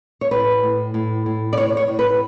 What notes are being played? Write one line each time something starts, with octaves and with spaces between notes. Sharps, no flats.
C#5
A2 B4
A2
A2
A2
D5
A2 C#5
C#5
A2
B4